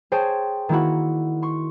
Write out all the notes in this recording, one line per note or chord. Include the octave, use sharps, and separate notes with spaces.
G#4 C5 C#5 G5 A5
D#3 A#3 E4 F#4
C6 C#6